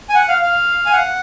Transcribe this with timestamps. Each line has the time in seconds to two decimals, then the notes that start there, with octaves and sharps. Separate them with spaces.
0.10 G#5
0.15 F#5
0.28 F5
0.42 F5
0.86 G#5
0.92 F#5